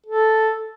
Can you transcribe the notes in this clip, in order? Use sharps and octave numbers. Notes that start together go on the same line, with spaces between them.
A4